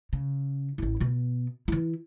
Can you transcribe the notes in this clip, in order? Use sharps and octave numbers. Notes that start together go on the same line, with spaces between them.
C#3
A1 E4
B2 B3
E3 E4